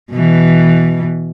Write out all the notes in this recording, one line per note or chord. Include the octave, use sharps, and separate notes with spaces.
B2 E3